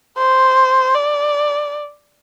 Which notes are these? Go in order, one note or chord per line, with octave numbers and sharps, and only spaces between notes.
C5
D5